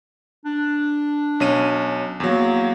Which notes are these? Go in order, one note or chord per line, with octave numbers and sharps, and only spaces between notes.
D4
B1 C#4 D#7
E2 F#3 A#3